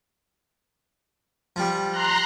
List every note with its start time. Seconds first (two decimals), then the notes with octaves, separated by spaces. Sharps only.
1.56 F3 G3
1.91 A#5 C6 F#6